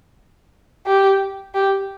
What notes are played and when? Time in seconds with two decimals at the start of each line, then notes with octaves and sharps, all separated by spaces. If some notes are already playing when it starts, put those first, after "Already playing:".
0.86 G4
1.55 G4